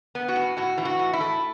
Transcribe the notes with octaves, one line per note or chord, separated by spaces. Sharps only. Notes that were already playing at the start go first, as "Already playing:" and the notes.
B3
F#4
A2
A2 F#4
E3
F#4
A2
E4
A3